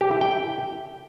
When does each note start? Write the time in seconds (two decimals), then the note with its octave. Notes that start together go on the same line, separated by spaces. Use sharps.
0.01 G4
0.11 E4
0.21 G5